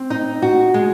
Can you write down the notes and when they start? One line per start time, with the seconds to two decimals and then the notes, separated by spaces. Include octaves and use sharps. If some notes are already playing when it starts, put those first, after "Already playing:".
Already playing: C4
0.10 D#4
0.42 F#4
0.74 G#3